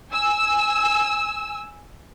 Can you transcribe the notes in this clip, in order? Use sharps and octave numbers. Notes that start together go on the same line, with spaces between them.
G#5 E6